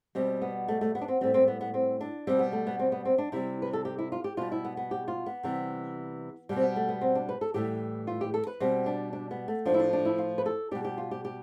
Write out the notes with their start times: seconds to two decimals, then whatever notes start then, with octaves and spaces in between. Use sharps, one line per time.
0.15 B2 G3 C4
0.42 B3
0.68 A3
0.81 A3
0.95 B3
1.01 D4
1.08 C4
1.21 A2 G3 C4
1.34 C4
1.48 B3
1.61 B3
1.74 C4
2.01 D4
2.27 B2 G3 C4
2.39 B3
2.52 A3
2.67 B3
2.79 C4
2.92 B3
3.05 C4
3.18 D4
3.32 C3 G3 E4
3.62 B4
3.73 A4
3.85 G4
3.98 E4
4.12 F4
4.24 G4
4.37 B2 G3 F4
4.52 E4
4.65 B3
4.77 B3
4.91 G4
5.08 F4
5.26 B3
5.43 C3 E3 G3
6.49 B2 G3
6.56 C4
6.63 B3
6.76 A3
6.89 B3
7.01 C4
7.15 D4
7.29 B4
7.41 A4
7.54 A2 E3 G3 G4
8.07 F4
8.21 G4
8.34 A4
8.47 B4
8.60 B2 G3 C4
8.86 D4
9.13 D4
9.31 B3
9.48 A3
9.66 A2 F3 D4
9.74 E4
9.79 D4
9.93 D4
10.05 E4
10.18 F4
10.38 B4
10.46 A4
10.71 B2 G3 G4
10.85 G4
10.98 F4
11.11 G4
11.25 G4